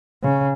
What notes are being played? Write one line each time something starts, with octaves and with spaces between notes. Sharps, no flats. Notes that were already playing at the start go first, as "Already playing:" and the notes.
C#3